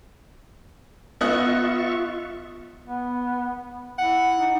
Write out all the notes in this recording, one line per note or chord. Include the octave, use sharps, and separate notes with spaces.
B3 F4 D#5 E5 C#6 F#6
B3
E4 F#5
D#4